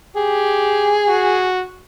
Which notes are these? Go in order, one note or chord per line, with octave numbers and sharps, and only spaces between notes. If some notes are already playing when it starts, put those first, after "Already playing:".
G4 G#4
F#4